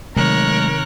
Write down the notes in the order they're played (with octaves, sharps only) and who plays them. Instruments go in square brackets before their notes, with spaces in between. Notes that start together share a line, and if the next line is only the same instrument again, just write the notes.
[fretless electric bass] C3 D#3 [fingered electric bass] F#3 G#3 A3 [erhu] A#4 [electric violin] C#5 F#6